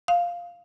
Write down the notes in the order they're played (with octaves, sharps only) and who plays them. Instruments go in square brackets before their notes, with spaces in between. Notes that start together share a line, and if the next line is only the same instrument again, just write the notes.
[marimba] F5